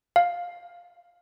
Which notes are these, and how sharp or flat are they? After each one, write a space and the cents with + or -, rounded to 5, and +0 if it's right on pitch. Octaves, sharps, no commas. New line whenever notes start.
F5 +10